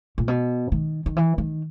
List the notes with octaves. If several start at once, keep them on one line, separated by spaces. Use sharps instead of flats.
A#2
B2
D#3
D#3
E3
D#3